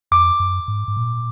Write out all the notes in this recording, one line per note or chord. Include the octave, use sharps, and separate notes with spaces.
F2 D6
F#2
G#2
G#2
A#2